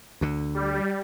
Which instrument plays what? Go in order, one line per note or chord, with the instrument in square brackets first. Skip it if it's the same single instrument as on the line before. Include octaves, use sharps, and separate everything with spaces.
[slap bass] D2 D3
[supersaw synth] G3